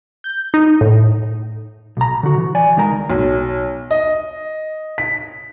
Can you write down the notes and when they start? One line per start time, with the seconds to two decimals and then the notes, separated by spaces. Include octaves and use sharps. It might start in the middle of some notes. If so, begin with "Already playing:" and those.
0.24 G6
0.54 D#4
0.81 A2
1.97 B1 A#5
2.23 D3 F#4
2.38 E3
2.55 D5 G#5
2.77 C#2 D#3 G#3 D#4 A#4 A#5
3.10 B1
3.91 D#5
4.98 B6